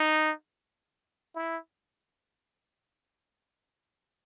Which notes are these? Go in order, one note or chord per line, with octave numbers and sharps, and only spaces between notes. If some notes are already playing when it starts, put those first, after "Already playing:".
Already playing: D#4
E4